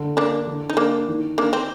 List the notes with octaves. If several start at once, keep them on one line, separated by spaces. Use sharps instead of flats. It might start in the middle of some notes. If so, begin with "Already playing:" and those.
Already playing: D3
A#3 D4
D3
D#4
A#3 D4
D#3
A#3 D4
C4